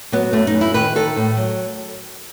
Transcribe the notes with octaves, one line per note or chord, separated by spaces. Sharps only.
F#3 B3
F#2 A3
D#4
E3
E4
D#3 B4
D#3 A4
A2
F#3